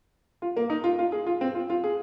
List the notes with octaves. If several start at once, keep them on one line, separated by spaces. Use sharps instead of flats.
F4
A#3
D#4
F4
F4
G#4
F4
C4
F4
F4
G#4